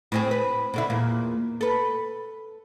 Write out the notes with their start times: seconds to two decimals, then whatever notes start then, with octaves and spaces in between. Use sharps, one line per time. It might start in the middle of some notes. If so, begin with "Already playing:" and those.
0.12 A2 C4 G#4
0.31 B4
0.74 B2 D3 E4
0.90 E2 A#2 A#3
1.61 A4 B4